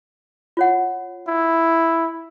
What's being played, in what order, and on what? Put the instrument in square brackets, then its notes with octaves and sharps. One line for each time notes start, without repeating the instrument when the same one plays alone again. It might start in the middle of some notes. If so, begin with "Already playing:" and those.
[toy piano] F4 C#5 F#5
[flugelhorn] E4